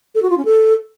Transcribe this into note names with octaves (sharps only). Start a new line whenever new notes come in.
A4
F#4
F4
C#4
A4